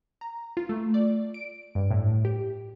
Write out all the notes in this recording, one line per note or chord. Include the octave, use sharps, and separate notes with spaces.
A#5
F4
A3
D5
D7
G2
A2
G4